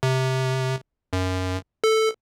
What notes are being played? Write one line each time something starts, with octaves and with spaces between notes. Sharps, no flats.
C3
F#2
A4